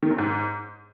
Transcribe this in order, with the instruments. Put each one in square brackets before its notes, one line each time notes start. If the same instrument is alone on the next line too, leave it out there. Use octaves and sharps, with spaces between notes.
[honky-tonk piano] D#3
F#2
G#2